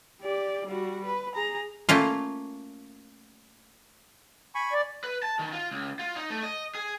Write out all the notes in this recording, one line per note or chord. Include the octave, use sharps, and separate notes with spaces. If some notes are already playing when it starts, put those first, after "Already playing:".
G4 D5
G3 F#4
B4
G#4 A#5
A3 A#3 C#4 F4
G#5 B5 C#6
D5
B4
A5
D#3
F4
C#2
F4
D#4
A3
D#5
G#4